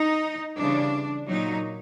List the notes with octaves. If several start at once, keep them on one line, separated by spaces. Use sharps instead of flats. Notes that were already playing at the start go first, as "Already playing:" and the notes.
Already playing: D#4
C#3 E3 G3 D4
A#2 F#3 D#4